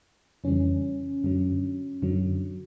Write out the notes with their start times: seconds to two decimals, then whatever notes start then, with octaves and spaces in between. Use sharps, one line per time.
0.44 F2 C#3 E3 G3 C#4
1.24 F#2 D3 F#3
2.02 F#2 D3 F#3